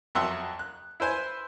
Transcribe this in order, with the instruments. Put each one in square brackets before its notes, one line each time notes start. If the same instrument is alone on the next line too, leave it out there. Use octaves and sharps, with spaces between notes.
[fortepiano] F2 F#3 E5 F#5 C6
F#6
E4 B4 C5 G#5